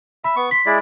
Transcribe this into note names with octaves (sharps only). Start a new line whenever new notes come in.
E5 B5
B3 C#6
C6 B6
G#3 E4 D5